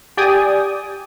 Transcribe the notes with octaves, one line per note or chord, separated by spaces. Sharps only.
G4 D5 G5 G#5 D#6